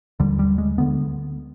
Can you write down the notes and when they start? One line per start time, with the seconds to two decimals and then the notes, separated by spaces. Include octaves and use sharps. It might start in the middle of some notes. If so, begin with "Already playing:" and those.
0.20 D#2 D3 G3
0.39 G3
0.58 G#3
0.78 D2 D3 B3